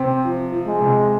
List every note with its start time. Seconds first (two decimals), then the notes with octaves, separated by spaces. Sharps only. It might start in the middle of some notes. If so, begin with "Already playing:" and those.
Already playing: C3 C4
0.24 F3
0.52 F3
0.67 G#3
0.81 C3